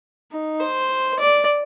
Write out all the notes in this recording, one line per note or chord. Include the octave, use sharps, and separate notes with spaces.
D#4
C5
D5